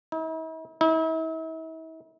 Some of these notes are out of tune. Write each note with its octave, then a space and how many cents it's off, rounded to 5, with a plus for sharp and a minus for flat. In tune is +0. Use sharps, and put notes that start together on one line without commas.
E4 -45
E4 -40